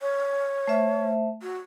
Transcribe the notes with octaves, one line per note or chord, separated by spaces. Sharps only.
C#5
A3 C5 E5
F#4